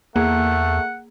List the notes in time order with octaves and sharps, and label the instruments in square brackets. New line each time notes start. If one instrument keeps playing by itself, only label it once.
[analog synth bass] E2 [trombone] A3 [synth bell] A#3 G#4 [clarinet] F#5